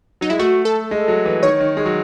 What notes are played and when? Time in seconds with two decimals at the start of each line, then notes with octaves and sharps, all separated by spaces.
0.21 F#3 D#4
0.30 G#3 E4
0.39 A3 F#4
0.65 A4
0.91 G#3
1.08 F#3
1.25 E3
1.42 D#3 C#5
1.60 D#3
1.77 G#3
1.86 F#3